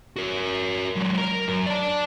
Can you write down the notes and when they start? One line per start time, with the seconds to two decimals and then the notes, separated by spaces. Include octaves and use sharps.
0.16 F#4 A#4
0.96 F#3 G#3
1.18 A#4 A#5
1.48 F#2
1.66 D5 A5